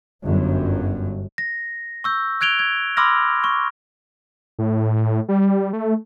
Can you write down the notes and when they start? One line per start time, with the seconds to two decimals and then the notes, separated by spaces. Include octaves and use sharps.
0.24 G1 F#2
1.38 A#6
2.04 C#6 E6 G6
2.41 F#6 G#6 D7 F7 G7
2.59 G#6
2.97 B5 C6 D6 E6 F6 A#6
3.44 C#6
4.59 A2
5.29 G3
5.73 A3